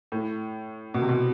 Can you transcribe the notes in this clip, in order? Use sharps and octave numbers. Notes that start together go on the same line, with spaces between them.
A2
B2
C3
B2